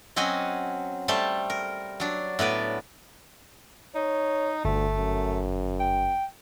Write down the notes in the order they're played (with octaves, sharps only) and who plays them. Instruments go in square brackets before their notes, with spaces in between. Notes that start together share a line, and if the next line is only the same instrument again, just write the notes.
[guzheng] F#3 C4 C#4 F#4 D#5 G#5
G3 A3 C5 A5 B5
A#4
F#3 D4
A2 B3 B4 D5
[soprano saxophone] D#4 [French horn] C#5
[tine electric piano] G1 [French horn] D2 [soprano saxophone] A3
[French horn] F#2
[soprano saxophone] G5